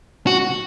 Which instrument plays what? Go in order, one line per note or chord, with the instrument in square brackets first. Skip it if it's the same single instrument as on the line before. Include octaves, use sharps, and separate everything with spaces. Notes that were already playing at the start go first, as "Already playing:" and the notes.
[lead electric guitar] F#4